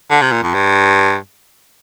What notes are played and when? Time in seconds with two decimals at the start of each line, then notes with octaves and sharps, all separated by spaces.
0.10 D3
0.22 C3
0.32 A#2
0.43 F2
0.54 G2